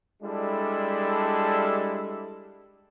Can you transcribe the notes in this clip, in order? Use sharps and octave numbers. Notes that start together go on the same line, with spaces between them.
G3 G#3 D4 E4 A4